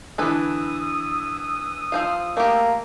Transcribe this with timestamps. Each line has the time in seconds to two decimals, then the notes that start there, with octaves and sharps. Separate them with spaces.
0.18 D3 E3 A4 B4 G#5 D#6 E6
1.92 F3 C5 F5
2.37 A3 A#3 G4